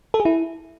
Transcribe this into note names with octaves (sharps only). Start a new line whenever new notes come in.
A4
G#4
E4